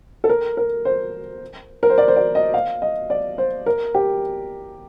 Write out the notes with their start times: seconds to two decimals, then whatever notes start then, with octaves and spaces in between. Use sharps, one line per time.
0.24 A4
0.29 A#4
0.57 A#4
0.85 C5
1.83 A#4
1.90 C5
1.98 D5
2.08 C5
2.16 D5
2.35 D#5
2.54 F5
2.82 D#5
3.10 D5
3.38 C5
3.66 A#4
3.95 G4